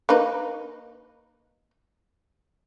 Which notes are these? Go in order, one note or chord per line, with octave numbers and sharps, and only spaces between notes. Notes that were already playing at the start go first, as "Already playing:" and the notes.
A#3 D#4 B4